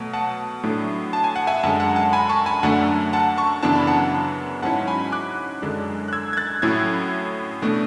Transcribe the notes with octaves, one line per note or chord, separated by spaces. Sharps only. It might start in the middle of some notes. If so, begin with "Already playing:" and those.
Already playing: B2 F#3 A3
F#5 A5
A2 F#3 A3 D4
A5
G#5
F#5
E5 G#5
F#2 D3 G#3 F#5 A5
F#5 A5
F#5 A5
G#5 B5
A5 C#6
G#5 B5
F#2 D3 A3 D4 F#5 A5
F#5 A5
A5 C#6
F#2 C#3 E3 B3 D4 A5
B5
F#5 A5
G#2 F#3 C#4 E4 F#5 A5
G#5 B5
D6 F#6
F#2 D3 G#3 D4
F#6
E6 G#6
G#6
F#6 A6
A2 F#3 C#4 E4 E6 G#6
B2 A3 D4